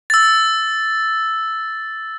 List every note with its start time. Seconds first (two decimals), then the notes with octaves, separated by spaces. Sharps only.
0.10 E6 A6